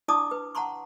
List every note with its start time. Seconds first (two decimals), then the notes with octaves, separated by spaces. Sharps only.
0.08 D4 E4 D5 A5 D6 D#6
0.31 B4
0.55 F#5 A5 A#5 C6 C#6